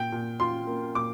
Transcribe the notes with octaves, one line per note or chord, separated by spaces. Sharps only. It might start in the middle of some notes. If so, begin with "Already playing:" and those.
Already playing: A#2 G5
A#2
F4 C6
A#3
A#2 D6